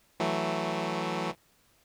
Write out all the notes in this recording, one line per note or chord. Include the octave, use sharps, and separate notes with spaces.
E3 F#3 A3